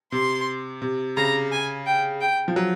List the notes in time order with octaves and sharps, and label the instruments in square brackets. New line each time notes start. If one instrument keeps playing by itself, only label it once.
[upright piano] C3 [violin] C6
[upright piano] C3
[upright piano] C#3 [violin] A#5
[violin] G#5
G5
G5
[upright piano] F3
F#3